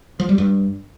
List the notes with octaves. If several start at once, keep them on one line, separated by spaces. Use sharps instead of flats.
F3
G3
G2